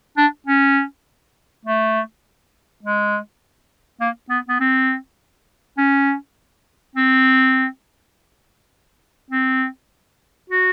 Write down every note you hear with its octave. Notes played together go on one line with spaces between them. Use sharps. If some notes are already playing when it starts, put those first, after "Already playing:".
D4
C#4
A3
G#3
A#3
B3
B3
C4
C#4
C4
C4
F#4